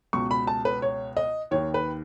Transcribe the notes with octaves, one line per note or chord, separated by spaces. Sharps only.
C#2 B2 C#6
B5
A5
B4
C#5
D#5
D#2 D#3 C#5
B4